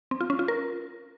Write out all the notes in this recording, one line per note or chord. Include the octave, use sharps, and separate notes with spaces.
C4
F4
C#4
F4
A#4